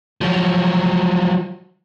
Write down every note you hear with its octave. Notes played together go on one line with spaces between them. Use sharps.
F3 F#3